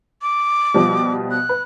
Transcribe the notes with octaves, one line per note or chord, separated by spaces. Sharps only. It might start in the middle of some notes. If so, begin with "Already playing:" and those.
D6
B2 F3 G3
F#6
B4